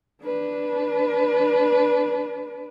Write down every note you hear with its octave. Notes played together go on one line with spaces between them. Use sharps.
D4 B4